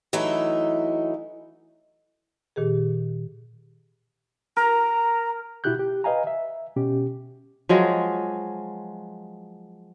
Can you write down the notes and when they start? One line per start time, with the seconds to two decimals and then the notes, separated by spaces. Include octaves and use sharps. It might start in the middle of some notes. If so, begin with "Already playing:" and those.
0.13 E3 F#3 A3 D#4 E4 E5
2.56 A#2 D#3 G4 G#4
4.57 A#4 A#5
5.64 B2 E4 F#4 G4 F#6 G6
5.79 G4
6.04 B4 D#5 F5 G#5 A#5
6.27 E5
6.76 B2 C#4 G4
7.69 F3 F#3 G#3